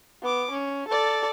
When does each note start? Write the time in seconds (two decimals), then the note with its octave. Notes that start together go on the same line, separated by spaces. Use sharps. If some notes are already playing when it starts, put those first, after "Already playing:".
0.22 B3 D6
0.51 C#4
0.89 A4 D5